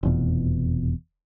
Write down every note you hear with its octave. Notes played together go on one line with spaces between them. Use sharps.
F1 E2 B2